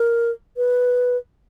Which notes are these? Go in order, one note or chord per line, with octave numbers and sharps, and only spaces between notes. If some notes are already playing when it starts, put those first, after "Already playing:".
Already playing: A#4
B4